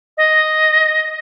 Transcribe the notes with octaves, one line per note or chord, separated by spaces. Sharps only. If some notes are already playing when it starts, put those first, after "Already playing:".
D#5